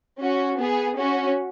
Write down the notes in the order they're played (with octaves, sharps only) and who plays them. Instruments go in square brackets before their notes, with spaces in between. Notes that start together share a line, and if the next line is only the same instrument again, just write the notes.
[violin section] C#4 F#4
B3 G#4
C#4 F#4